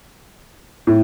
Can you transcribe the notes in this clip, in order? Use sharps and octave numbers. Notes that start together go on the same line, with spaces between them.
A2